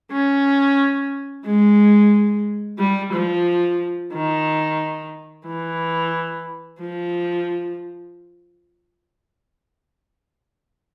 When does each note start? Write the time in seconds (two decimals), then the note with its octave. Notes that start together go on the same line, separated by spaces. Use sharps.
0.12 C#4
1.45 G#3
2.79 G3
3.13 F3
4.13 D#3
5.47 E3
6.80 F3